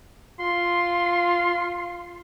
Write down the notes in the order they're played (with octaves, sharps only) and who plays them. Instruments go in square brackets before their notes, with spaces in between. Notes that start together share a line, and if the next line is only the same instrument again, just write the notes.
[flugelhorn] F4 [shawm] C6